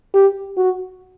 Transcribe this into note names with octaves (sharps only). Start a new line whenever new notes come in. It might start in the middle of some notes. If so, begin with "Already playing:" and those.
G4
F#4